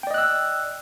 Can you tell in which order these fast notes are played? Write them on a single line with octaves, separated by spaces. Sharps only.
G5 D5 D#5 F#6 E6